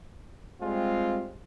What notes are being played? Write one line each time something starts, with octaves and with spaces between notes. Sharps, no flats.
G3 G#3 C4 F4